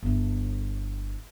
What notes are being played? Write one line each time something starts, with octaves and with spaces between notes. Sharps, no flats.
G1 E4